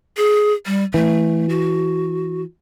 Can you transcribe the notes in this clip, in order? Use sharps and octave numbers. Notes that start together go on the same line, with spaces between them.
G#4
G3
E3 A3
F#4